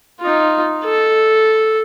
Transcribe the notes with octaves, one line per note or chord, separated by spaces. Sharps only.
D#4 F4
A4